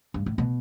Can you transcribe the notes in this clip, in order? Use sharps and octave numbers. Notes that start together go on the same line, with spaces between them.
G2
A2
B2